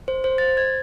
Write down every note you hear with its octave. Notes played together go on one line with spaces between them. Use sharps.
C5
C5
A6
G#6